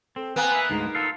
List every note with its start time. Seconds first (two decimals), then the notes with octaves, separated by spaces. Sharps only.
0.16 C4 A4
0.36 A#3 B3 G#5 F#6
0.52 B4 E5
0.69 D2 G#2 G#3 D#4
0.95 F4 A4 F5 E6